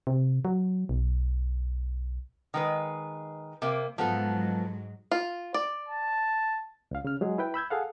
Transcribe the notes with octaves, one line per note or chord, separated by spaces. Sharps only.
C3
F#3
B1
D#3 G#3 B4
C3 A#3
G#2 F3 F#3 G#3 B3 A4
F4
D5
A5
C#2 F5
C#3 F6
F#3 G#3 G#4
E4 B4 G5
B5 E6 G6 G#6
G#4 A4 F5 F#5